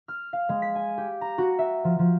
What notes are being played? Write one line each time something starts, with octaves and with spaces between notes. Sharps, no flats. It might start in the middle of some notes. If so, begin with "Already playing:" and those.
F6
F5
G#3
B6
G#5
G4
A#5
F#4
E5
F3
F3